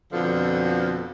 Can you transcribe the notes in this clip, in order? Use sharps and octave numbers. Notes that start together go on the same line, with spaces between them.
F2 B2 D3 F3